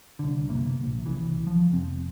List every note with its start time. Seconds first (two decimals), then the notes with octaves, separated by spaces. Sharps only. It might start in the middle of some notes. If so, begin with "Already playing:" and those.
0.19 C2 D3
0.49 F#1 C3 A#3
0.84 A#1
1.06 C2 C#3 E3
1.47 F3
1.72 F1 C4